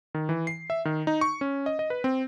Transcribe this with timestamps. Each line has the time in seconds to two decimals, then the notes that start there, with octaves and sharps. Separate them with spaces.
0.14 D#3
0.29 E3
0.47 C7
0.70 E5
0.85 D#3
1.07 D#4
1.21 C#6
1.41 C#4
1.66 D#5
1.79 D#5
1.90 B4
2.04 C4